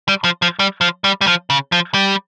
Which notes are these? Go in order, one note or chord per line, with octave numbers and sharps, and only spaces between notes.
G3
F3
F3
G3
F3
G3
G3
F3
C#3
F3
G3